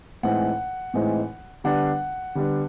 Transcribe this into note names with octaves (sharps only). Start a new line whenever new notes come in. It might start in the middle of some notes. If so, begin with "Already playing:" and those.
A2 E3 G#3 C4 D#4 F#5
A2 E3 G#3 C4 D#4
D3 G3 B3 D4 F#5
D3 G3 B3 D4